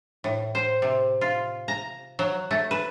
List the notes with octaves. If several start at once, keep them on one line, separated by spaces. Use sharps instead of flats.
A2
C5
C3
F4
A#5
F#3
A3
B4